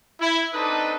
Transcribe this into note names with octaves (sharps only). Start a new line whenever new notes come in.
E4
C4 D4 D#4 A4 B4 D#5